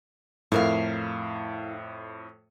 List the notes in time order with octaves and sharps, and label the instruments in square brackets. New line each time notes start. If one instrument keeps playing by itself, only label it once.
[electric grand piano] F2 A2 [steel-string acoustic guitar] E4 A#4 F5